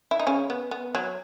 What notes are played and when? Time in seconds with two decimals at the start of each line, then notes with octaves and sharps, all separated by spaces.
0.11 E4
0.19 D#4
0.27 C#3 C#4
0.50 B3
0.71 B3
0.95 F#3